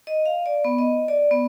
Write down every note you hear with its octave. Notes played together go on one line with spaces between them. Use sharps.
D#5
F5
D5
B3
D#5
D5
B3